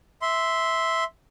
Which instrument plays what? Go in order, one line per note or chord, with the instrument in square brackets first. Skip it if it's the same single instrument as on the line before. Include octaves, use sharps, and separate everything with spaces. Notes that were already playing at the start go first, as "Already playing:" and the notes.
[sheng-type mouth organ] E5 C6